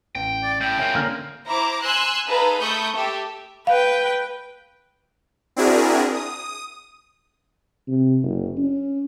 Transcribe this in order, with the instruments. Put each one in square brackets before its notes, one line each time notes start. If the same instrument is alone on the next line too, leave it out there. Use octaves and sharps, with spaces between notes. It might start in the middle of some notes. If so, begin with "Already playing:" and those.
[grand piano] A1 [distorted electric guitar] G5
[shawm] D5
[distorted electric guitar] A2 [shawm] G5
[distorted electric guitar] C#3 F4 [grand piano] A#4 E5 G#5
[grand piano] D3 C#4 D4 [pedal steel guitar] A#3 F6
[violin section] E4 C5 A#5 D6
G#5 C6 E6 F#6
D#4 G#4 A4 B4 F5 A#5
A3 A4 B5 C#6 D#6 G6
G4 A4 E5
[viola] B4 G5 [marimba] F5
[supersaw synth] C4 D4 E4 F#4 G#4 A#4
D#6
[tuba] C3
F#1
C#4